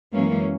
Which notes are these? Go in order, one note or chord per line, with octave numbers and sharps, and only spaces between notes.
F#2 E3 G#3 A#3 C#4